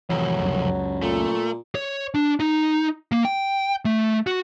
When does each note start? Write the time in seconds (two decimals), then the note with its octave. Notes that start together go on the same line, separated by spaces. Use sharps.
0.10 C2 F2 E3 F#3
0.40 C#2 F#2 C#3
1.02 A#2 A3
1.75 C#5
2.14 D4
2.40 D#4
3.12 A#3
3.25 G5
3.85 A3
4.27 F#4